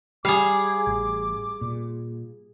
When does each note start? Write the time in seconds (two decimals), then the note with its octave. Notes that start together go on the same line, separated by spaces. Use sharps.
0.25 G3 G#4 F5 D6
0.87 A1
1.61 A#2